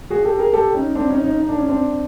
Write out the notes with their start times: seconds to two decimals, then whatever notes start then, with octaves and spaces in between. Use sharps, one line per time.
0.10 F#4 G#4
0.25 G4 A4
0.39 G#4 A#4
0.53 G4 A4
0.74 C#4 D#4
0.95 C4 D4
1.09 C#4 D#4
1.24 C#4 D#4
1.39 D#4
1.49 D4
1.58 C#4
1.68 C4 D4